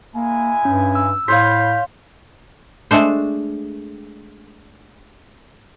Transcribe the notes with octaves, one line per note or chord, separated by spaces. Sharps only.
G#3 A#3 E4 G#5
G2 C#4
E6
A2 C5 C#5 F5 B5 G6 B6
G#3 A3 D4 C5